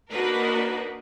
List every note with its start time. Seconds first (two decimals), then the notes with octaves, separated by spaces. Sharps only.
0.10 A#3 D4 D#4 F#4 A#4 B4